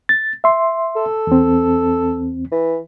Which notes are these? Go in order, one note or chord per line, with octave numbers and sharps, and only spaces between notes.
A6
E5 C6
A4
E2 C4
E3